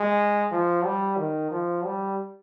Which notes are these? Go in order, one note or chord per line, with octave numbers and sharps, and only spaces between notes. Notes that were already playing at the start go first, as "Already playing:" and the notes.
Already playing: G#3
F3
G3
D#3
F3
G3